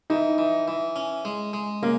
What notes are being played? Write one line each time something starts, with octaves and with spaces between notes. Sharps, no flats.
E3 D#4
E3
E3
C#4
G#3
G#3
C#3 A#3